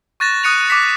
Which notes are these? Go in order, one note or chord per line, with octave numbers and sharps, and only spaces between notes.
C#6 F#6 A6 A#6 E7
D#6 F#6 C#7 D#7 F7
D6 F#6 B6 C#7